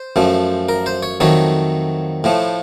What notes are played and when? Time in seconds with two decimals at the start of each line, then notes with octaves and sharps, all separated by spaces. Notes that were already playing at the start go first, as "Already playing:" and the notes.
Already playing: C5
0.16 F#2 F3 A3
0.69 A#4
0.86 C5
1.03 C#5
1.20 F2 D#3 F#3 A3 C#5
2.24 A2 F3 A3